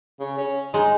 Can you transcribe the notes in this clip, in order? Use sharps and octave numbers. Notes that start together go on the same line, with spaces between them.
C#3
C#4
G#3 D#4